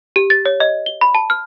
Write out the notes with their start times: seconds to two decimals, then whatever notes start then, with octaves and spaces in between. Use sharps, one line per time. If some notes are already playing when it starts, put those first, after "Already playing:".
0.16 G4
0.30 A6
0.46 C#5
0.60 D#5
0.86 G7
1.01 B5
1.15 A5
1.30 F6